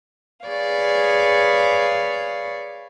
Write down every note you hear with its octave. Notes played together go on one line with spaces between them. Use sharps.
G#4 B4 C#5 D5 F5